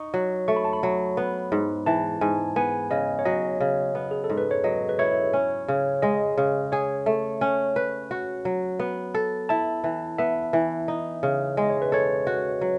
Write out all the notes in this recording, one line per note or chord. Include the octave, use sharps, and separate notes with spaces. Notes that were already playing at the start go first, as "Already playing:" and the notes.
Already playing: D#4 C#6
F#3
A3 C#6
B5
A5
B5
F#3
B3
G#2
E3 A5
G#2 G#5
B3 G#5
C#3 D#5
C#5
F#3 D#5
C#3
B3
G#4
A4
G#2
B4
C#5
F#3 D#5
B4
E4 C#5
C#4
C#3
G#3 D#5
C#3
G#4 C#5
A3
C#4
B4
F#4
F#3
B3
A4
E4 A5
E3
B3 E5
E3
D#4
C#3
G#3 D#5
C#5
B4
A4 C#5
F#4
F#3